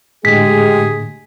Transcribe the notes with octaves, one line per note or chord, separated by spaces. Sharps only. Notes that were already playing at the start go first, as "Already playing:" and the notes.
A2 D3 G#3 A3 G4 G#4 B6